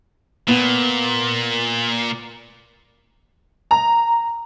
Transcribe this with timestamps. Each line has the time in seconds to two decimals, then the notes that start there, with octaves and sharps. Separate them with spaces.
0.48 A#2 B3
3.71 A#5